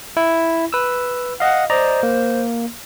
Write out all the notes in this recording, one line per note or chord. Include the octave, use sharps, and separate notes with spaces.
E4
B4 E6
D#5 F5 F#5
C5 D5 D#5 A#5
A#3